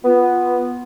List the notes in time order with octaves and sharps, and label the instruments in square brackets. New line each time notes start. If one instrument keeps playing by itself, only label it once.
[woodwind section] B3 F4